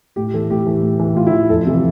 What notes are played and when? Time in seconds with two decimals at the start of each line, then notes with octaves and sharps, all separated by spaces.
0.16 A2 G4
0.34 E3 A4
0.50 A2 G4
0.67 E3
0.82 A2
0.99 E3
1.16 A2 F4
1.27 E4
1.32 E3
1.49 F2 A4
1.66 C3 E3